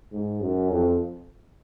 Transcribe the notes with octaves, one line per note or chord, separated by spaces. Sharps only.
G#2
F#2
F2